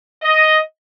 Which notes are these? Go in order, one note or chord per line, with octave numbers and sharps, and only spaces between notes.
D#5